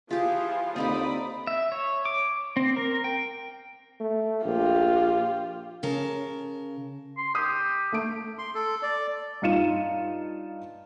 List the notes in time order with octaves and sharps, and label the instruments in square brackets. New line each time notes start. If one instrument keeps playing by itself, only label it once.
[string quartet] E3 F3 [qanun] F4 G4 [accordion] G#4 [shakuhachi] F5
[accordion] D#2 D3 [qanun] C4 D#4 G4 [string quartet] D5 B5 D#6
[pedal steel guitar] E5
C#5
D6
C4
A#4
G5
[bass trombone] A3
[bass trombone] A#1 [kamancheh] F4 G4
[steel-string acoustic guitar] C#3 A#4 A5
[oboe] C6
[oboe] G4 [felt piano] D#6
[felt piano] A3 D7
[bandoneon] C6
A4
D5
[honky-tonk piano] G2 D#4 F4 C#7 D#7 E7